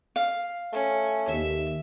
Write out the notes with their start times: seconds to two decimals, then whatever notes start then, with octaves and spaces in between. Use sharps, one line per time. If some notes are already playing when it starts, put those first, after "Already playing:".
0.16 F5
0.73 A3 C#4
1.28 D#2 E5